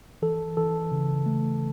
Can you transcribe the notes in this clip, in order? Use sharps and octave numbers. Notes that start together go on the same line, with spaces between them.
E3 A4
E3 A4
C#3
A3